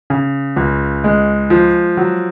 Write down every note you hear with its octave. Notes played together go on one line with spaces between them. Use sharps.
C#3
C#2
G#3
F3
F#3